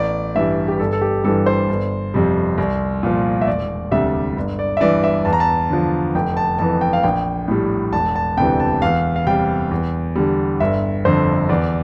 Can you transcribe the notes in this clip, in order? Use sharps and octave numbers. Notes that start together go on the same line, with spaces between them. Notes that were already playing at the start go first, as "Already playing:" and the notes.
Already playing: A1 D5
G2 E3 G3 E5
G4
G1 A4
A4
G4
G2 E3 G3 A4
C5
G1
F2 C3 G3
C2
A#2 F3
E5
E1 D5
D2 C3 G3 E5
G1
D5
E5
G2 E3 D5
E5
E2 A5
A#5
A5
D3 F3
F1 G5
A5
F2 E3 A5
G5
F5
A#1 G5
A2 G3
E1 A5
A5
D2 C3 E3 G5
A5
E2 F5
F5
C3 G3 G5
E2
D3 G3
G1 E5
F2 D3 C5
E2 D5